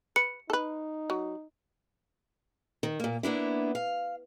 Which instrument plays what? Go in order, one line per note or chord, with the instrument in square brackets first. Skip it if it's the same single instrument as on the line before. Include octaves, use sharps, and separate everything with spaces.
[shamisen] B4 [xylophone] C#7
[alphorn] D#4 [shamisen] A4 B4
[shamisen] F#3
[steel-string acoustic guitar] D#3
A#2 A#3
A#3 B3 D4 E4
F5